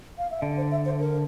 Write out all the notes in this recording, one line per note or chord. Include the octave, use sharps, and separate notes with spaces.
F5
E5
D3 D5
C5
E5
C5
A#4